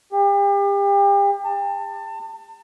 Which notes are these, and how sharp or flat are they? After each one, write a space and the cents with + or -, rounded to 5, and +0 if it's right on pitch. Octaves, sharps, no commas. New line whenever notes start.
G4 +35
A5 +25